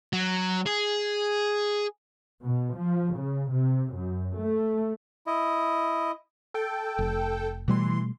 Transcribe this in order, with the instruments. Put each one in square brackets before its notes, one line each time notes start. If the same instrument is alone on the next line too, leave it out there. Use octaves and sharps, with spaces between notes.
[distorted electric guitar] F#3
G#4
[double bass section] B2
F3
C#3
C3
F#2
A3
[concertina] E4 D#5
[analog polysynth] A4 G5
[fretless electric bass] F1
[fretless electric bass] B2 G3 A3 [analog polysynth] E3 C6